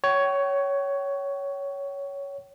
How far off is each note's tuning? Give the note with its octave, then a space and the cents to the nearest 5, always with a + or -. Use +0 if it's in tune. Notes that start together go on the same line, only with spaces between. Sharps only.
C#5 +10 G5 -45